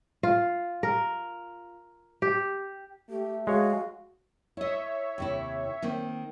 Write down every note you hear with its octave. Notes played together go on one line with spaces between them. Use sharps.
F4
A#4
G4
A3 G4
G#3 F#4 C#5 F5
E4 C#5 D#5 E5
D#2 C3 E4
D#3 A#3 C4